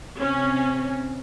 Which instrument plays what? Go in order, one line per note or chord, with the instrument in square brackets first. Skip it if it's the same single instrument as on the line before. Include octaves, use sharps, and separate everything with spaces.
[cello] C3 C4 [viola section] C#4